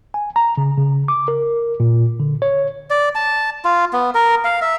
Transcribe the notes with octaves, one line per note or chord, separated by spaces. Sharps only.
G#5
A#5
C#3
C#3
D6
A#4
A#2
D3
C#5
D5
A5
F4
B3
A#4
F5
E5